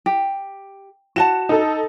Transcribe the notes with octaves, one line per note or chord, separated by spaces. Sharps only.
G4
F#4 F#5 A5 E7
D#4 A4